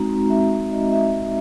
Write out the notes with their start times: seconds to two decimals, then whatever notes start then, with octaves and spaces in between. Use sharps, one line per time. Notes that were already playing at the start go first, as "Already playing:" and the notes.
Already playing: G#3 C4 D#4 F#4 A#5
0.30 E5
0.71 D#5
0.92 E5